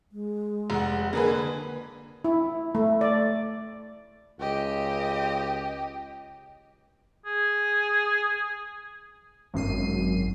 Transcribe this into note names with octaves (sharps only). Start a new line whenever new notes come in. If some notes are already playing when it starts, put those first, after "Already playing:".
G#3
F1 F#5
D3 A#3 G#4 B4
E4
A3
D5
C#2 G4 D#5
G#4
G#1 F#2 C7 D#7